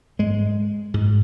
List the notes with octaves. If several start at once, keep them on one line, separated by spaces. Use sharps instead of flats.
G#2 G#3
G#2